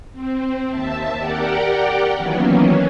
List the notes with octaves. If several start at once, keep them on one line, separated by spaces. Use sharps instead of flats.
C4
D#2 E5 A5
G4 A#4 D5 F#5 G5
D#3 E3 F#3 A#3 B3 C#4